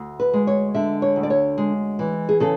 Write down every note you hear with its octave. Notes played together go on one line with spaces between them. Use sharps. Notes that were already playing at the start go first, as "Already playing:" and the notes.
Already playing: D2
B4
G#3
C#5
D3 E5
C#5
D2
D5
C#5
G#3
E3
G#4
C#3 A4